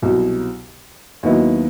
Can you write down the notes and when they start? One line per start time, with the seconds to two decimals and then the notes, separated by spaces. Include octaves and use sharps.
0.02 C2 B2 F#3
1.23 D#2 D#3 F#3 B3 E4